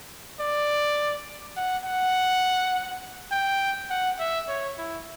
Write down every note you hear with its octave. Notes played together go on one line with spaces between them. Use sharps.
D5
F#5
F#5
G5
F#5
E5
C#5
E4